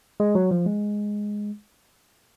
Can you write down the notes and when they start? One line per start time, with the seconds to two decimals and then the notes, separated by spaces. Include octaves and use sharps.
0.20 G#3
0.35 F#3
0.51 F3
0.66 G#3